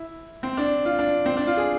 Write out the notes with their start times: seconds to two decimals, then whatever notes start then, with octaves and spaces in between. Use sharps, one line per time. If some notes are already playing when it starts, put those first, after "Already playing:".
Already playing: E4
0.43 C4
0.57 D4
0.85 F4
0.99 D4
1.26 C4
1.37 D4
1.47 F4
1.57 G#4